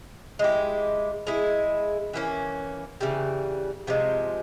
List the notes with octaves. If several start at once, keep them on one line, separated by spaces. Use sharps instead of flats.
G#3 E4 G4
G#3 E4 G#4
E3 A#3 C#4
C#3 E3 G3
C3 F3 G#3